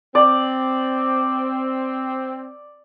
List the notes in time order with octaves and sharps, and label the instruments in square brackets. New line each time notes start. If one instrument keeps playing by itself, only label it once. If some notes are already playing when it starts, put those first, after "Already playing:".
[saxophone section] C4 [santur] D5